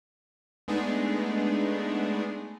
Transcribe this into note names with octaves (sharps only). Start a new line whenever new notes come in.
G#3 A3 B3 D4 D#4 G#4